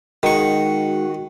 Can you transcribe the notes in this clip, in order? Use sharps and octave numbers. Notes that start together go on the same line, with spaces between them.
D#3 G#3 D#4 F#4 C#6